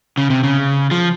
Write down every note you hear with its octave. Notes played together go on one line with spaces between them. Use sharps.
C#3
C3
C#3
F3